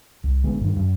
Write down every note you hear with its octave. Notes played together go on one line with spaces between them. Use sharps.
C2
A1 D3 G#3 B3
G2 D#3 G3
F#2